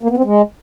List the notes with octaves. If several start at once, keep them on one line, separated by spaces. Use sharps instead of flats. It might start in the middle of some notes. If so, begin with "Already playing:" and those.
A#3
B3
C4
G#3